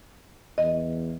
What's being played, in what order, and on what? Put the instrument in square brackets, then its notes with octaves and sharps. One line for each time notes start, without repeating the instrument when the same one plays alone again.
[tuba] E2 [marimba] D#5